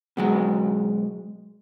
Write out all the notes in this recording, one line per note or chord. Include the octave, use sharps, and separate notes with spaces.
B2 F#3 G#3